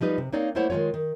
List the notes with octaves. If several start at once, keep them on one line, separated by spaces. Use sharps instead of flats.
F3 G3 D#4 B4
C3
A#3 C4 D#4 C#5 D5 F5
A3 A#3 E4 C5 C#5 F#5
D#3 G#3 D#4 F4 C#5
D#3